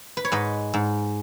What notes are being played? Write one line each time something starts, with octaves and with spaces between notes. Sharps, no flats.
B4
C#5
G#2 B4 D#5
G#2